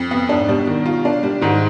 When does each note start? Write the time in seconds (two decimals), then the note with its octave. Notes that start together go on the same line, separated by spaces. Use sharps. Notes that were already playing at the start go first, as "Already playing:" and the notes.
Already playing: F2
0.11 B3
0.29 G#2 D4
0.48 B2 G3
0.67 D#3
0.86 F4
1.05 D4
1.23 G3
1.41 G#2 D#3